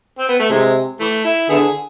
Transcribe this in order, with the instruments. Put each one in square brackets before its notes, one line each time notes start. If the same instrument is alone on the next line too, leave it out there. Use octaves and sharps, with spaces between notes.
[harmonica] C4
B3
A3
[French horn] C3 [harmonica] E3 G#3
[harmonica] E3 A3
E4
[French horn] D3 [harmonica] B3 E4 G#4